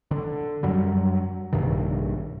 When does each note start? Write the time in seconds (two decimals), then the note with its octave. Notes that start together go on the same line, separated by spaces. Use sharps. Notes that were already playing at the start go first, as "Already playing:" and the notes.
0.11 D3
0.63 F#2 F#3 G3
1.53 A#1 G2 C3 D#3